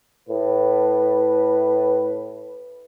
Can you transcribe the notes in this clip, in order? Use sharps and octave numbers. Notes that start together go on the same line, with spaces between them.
A2 B4